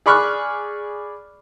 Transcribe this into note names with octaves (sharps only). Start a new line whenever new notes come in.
G#4 D5 B5 C#6 F6 F#6